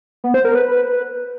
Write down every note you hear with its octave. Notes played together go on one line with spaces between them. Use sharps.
B3
C5
A#4
B4